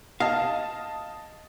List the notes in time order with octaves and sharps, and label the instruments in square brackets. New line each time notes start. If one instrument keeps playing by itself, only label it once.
[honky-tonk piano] D#5 A5 [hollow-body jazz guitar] F5